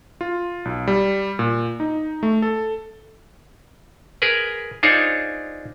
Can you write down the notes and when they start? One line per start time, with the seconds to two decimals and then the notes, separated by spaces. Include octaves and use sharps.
0.21 F4
0.65 B1
0.87 G3
1.39 A#2
1.80 D#4
2.23 A3
2.42 A4
4.22 G#4 A#4 B4
4.83 D4 D#4 F4 G#4 C5 C#5